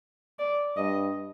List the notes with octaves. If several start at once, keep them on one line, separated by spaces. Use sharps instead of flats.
D5
G2 D#5